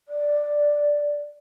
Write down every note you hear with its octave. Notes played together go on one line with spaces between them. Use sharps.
D5